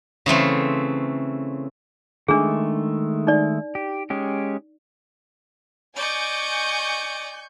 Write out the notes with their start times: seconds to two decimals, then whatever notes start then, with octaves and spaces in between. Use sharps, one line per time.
0.26 C#3 E3 A3 C4
2.28 D#3 G#3 A3 D4 G#4
3.27 D#4 D5
3.75 G4
4.10 G#3 C#4 G4
5.96 D5 D#5 G#5 C#6 G6